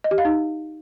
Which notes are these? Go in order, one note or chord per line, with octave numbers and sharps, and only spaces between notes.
D#5
G4
F5
D#4